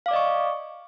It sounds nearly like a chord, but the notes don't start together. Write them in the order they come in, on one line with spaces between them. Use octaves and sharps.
F5 D6 D5 D#5 C#6